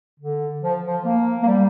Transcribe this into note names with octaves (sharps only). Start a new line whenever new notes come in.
D3
F3
F3
A#3
A#3
G3